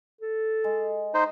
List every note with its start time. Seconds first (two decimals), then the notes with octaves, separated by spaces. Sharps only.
0.21 A4
0.64 G#3
1.14 D#4 C5